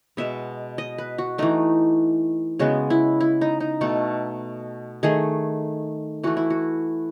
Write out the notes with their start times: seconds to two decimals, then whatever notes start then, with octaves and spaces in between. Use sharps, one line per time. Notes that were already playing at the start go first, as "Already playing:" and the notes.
0.17 B2 G#3 B3 E5
0.78 D#5
0.98 B4
1.18 F#4
1.38 E3 A3 D#4
2.59 C#3 G#3 B3 F#4
2.90 E4
3.20 E4
3.41 D#4
3.60 D#4
3.81 B2 A3 A4
5.03 D#3 A3 G#4
6.23 E3 A3 F#4
6.37 E4
6.50 F#4